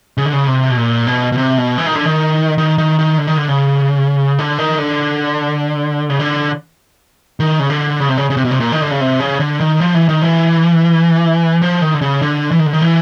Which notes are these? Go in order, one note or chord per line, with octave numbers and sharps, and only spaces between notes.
C#3
D3
C#3
C3
B2
A#2
B2
B2
C3
B2
E3
D#3
D3
D#3
D#3
D#3
D#3
D3
D#3
D3
C#3
D3
D#3
D3
C#3
D3
D#3
C#3
D3
C#3
C3
C#3
C#3
C3
B2
C3
A#2
D#3
D3
C#3
C3
C#3
D3
D#3
F3
E3
D#3
E3
F3
D#3
D3
C#3
D3
E3
D#3
D3
D#3
E3